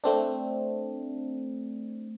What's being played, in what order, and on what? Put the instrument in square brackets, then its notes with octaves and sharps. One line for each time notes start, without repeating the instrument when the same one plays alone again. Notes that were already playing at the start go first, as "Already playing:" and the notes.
[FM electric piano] A3 C4 D4